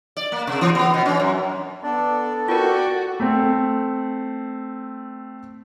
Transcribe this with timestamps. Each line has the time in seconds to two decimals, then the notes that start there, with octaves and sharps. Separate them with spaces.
0.17 D5
0.32 A#3
0.47 C3
0.61 E3
0.75 B3
0.94 B2
1.06 C#4
1.20 F#2
1.83 B3 D4 A4 D5
2.48 F4 F#4 A#4 D5 G5 C#6
3.20 A3 C4